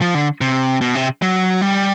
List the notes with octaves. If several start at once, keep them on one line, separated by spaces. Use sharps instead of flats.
F3
D3
C3
B2
C3
F#3
G3